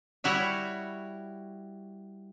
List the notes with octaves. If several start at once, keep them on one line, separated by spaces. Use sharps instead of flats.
G3 E4 F#4 C#5 E5